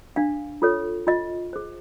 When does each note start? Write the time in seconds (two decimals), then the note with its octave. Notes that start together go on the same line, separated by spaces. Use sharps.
0.16 D4 F5
0.62 F4 A4 C#5
1.07 F4 D#5
1.53 G#4 C5